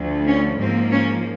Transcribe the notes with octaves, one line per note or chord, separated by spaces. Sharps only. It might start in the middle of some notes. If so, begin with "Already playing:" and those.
Already playing: D2 D3 F3
C#4
G#2 F3 A#3 C4
C#4